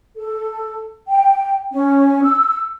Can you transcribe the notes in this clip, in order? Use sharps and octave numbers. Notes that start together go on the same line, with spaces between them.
A4
G5
C#4
E6